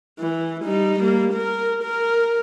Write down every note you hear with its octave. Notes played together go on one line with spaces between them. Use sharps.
E3
G3 D#4
G3 A#3
A#4
A#4